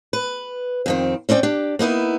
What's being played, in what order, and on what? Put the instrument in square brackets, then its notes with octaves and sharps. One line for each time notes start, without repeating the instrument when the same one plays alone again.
[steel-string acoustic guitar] B4
F2 D#3 C4
C4 C#4 E4 D5 G5
D4 G4
A#3 B3 D#4 E4